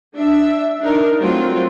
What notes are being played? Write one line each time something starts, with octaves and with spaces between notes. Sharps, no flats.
D4 E5
D4 D#4 A#4
F#3 A3 C4 F4